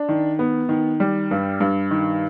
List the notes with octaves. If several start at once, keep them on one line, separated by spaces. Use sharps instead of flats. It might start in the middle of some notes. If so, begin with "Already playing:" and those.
Already playing: D4
D#3
B3
D#3
G3
G2
G2
D#3